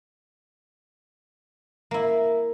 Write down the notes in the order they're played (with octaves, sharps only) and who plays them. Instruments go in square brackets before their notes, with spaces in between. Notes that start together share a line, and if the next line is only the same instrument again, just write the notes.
[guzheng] A#3 E4